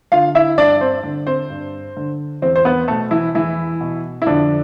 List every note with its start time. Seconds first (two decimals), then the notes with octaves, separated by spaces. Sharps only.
0.12 D3 F4 F5
0.35 E4 E5
0.58 G2 D4 D5
0.81 C4 C5
1.03 D3
1.26 C4 C5
1.50 G2
1.97 D3
2.42 E2 C4 C5
2.56 C5
2.65 B3 B4
2.88 B2 A3 A4
3.11 E3 E4
3.34 E2 E3 E4
3.81 B2
4.22 E4
4.26 F2 D3 D4